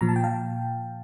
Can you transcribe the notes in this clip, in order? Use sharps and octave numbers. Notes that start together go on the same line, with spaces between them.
A#2 F3 A#5
A5
G5
F5 A5